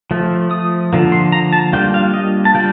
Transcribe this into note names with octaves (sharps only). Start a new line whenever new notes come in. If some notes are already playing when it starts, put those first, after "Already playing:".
F3 A3
D#6
D3 F3 A#3
C6
A#5
A5
G3 A#3 D4 F4 G5
F5
D#5
A5
G3 A#3 D4 F4 G5